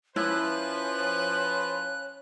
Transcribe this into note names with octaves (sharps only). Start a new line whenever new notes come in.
F3 C#4 E4 B4 F#6